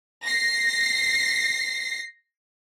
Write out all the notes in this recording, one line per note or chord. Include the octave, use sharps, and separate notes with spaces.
A#6 C7